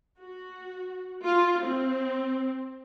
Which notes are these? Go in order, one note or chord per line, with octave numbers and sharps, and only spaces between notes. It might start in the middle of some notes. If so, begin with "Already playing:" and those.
F#4
F4
C4